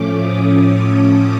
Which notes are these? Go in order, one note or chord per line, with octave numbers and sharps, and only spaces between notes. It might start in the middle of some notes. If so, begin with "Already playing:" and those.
Already playing: A2 F3 A3 C#4 D6
D#6
D6